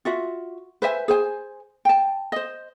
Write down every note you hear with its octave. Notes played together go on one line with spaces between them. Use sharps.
F4 F#4 E5
B4 C5 E5 G#5
G#4 C5 G#5
G5 A5
C5 D#5